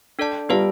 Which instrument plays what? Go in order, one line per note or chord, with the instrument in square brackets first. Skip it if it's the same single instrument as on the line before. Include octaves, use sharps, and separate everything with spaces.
[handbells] D4 A4 D5 A5
[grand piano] G3 [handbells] B3 F4 B4 F5 A5